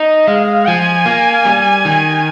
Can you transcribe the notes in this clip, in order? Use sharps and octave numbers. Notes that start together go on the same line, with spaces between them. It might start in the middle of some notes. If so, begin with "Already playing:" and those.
Already playing: D#4 D#5
G#3 F5
F3 G#5
A#3
G3
D#3